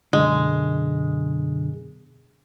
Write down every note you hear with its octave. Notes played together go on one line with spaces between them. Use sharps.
F#2 B2 D3 G#3